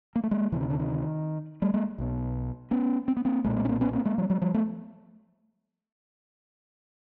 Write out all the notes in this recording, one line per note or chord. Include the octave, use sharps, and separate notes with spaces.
A#3
A3
G#3 A#3
D2 C3 D3 E3
D#3
D3
D#3
G3 A3
G#3 A#3
B1 B2
B3 C#4
C4
B3
A#3 C4
B1 A#2 G#3 A#3
G#3 A#3
C#4
A#3 C4
B3 C#4
A#3 C4
G#3 A#3
F3 G3
F#3 G#3
F3 G3
A3 B3